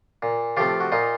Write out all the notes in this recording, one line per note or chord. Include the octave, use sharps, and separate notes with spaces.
A#2
F3 A3 C4 F4 G4
F#4
A#2 D#4 F4